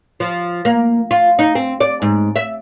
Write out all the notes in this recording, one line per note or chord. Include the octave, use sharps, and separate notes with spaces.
F3
A#3
F4
D#4
C4
D5
G#2
E5